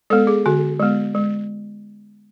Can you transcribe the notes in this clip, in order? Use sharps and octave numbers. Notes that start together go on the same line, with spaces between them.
G#3 B3 A4
G#4
D3 F#4
G#3 B3
G#3